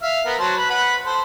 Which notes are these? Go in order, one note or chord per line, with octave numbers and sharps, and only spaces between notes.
E5 F5
B3 A#4
F#3 C5 A5
B4
B4 F#5
A4 C5